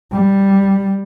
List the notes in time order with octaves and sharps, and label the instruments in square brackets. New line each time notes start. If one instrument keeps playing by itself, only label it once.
[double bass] G3